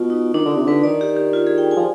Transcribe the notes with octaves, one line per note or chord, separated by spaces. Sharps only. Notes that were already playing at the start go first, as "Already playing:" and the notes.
Already playing: B2 F4
D#4
D#3 D4
D3
D#4
C3
D3 B4
D#3 D5
G4
G4
F4
G#4
G5
G#5
F3